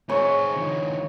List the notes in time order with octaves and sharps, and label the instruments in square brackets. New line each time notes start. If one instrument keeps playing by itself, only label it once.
[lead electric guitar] C4 G#4 [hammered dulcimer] C#5
[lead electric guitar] D#3 F3